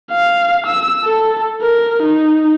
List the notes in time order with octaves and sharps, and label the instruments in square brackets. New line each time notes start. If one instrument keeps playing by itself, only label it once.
[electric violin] F5
E6
A4
A#4
D#4